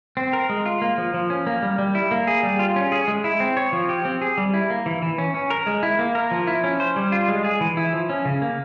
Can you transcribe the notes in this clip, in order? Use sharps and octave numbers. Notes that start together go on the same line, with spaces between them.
C4
A#4
G#3
F4
A#3
F3
F3
C#4
A#3
G3
G3
E4
A#3
G#4
G3
F4
C#4
G#4
G#3
E4
C4
C#5
F3
G4
C4
G#4
G3
E4
A#3
E3
E3
C#4
C#4
A#4
G#3
E4
A#3
A#4
F3
E4
C#4
C5
G3
F4
G#3
G#4
E3
E4
F3
C#4
C#3
A#3